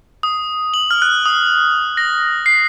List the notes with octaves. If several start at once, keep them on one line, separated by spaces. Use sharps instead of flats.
D#6
F#7
F6
F#6
D#6
A#6
C7